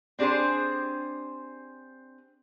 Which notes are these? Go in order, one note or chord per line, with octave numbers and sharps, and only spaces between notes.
C4 D4 G4 G#4 C5